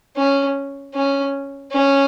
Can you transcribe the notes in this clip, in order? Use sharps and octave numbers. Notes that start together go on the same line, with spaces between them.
C#4
C#4
C#4